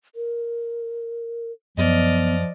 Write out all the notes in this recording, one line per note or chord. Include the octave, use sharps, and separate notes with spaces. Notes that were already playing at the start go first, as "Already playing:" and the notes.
A#4
F#2 F3 B3 D5 D#5 F6